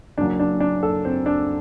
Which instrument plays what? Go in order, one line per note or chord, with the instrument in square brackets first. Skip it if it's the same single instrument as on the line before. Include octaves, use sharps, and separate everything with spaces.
[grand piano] F#1 F#2 F#3 D4
D4
D4
A4
C4
D4